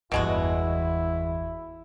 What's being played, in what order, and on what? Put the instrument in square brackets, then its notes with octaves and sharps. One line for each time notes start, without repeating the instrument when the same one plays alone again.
[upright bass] G1 E2 [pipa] B2 G#3 F#4 [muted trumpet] E4